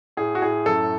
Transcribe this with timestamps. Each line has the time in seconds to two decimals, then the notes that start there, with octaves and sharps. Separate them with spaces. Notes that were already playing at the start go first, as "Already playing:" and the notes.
0.17 A2 G#4
0.35 F#4
0.42 A2 G#4
0.66 F#2 A4